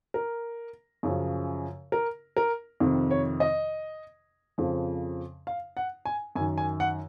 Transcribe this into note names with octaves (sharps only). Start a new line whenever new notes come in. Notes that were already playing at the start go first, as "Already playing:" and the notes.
A#4
F#2 C#3 F3
A#4
A#4
F2 C3 D#3
C#5
D#5
F2 C#3 F3
F5
F#5
G#5
F#2 D#3 G#5
G#5
F#5